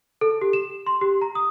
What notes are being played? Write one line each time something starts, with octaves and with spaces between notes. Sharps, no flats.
A4
G4
E7
C6
G4
A#5
D#6